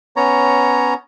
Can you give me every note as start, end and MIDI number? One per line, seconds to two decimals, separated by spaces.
0.16 0.94 59
0.16 0.94 61
0.16 0.94 73
0.16 0.94 82